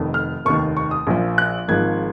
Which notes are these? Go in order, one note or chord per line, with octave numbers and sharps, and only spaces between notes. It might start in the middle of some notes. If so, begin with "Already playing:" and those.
Already playing: F1 F2 D#3
F6
F1 D#2 D#3 C#6
C#6
D#6
A#1 A#2 F3
F#6
G#1 G#2 F3 G#6